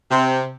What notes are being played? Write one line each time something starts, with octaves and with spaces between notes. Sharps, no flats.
C3